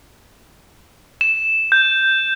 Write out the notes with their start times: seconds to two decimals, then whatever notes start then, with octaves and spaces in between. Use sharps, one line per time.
1.21 E7
1.72 G6